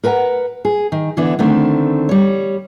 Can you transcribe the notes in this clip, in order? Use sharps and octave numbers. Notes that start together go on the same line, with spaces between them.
A#4 B4 F#5 G#5 A#5
G#4
D#3
D3 E3 B3 D4 E4
D3 D#3 A3 C4
G3 C#5